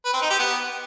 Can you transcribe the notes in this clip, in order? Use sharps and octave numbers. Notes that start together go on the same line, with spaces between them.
B4
C4
D#4
G4
B3